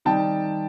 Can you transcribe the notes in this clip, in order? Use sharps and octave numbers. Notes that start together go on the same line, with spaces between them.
D#3 G3 C4 D#4 G5 A5